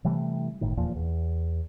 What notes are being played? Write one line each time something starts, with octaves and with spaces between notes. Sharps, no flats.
C3 E3 G3 A3
G1 A2 D#3
D#1 E2 A#2 F3
E2